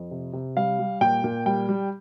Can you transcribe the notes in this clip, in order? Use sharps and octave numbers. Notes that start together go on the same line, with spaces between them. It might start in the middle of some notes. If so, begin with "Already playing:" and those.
Already playing: F2
C3
C3
G3 F5
G3
A#2 G5
A#2
G3 G5
G3